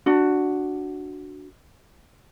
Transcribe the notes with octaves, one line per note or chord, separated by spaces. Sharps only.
D4 F#4